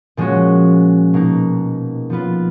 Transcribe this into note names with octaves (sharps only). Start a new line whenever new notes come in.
A#2 F3 G#3 C#4 F#4
B2 A#3 D#4
F3 B3 F4 B4